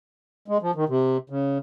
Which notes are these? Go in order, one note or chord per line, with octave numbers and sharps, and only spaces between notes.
G#3
F3
D#3
C3
C#3